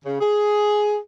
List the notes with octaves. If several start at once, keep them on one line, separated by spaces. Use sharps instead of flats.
C#3
G#4